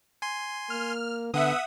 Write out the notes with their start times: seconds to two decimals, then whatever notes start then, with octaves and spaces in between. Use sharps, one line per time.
0.22 G#5 C6
0.70 A#3 F6
1.34 D3 B3 E5 F#5 D#6